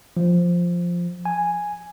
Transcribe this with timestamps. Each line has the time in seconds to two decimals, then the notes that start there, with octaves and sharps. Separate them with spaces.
0.17 F3
1.25 G#5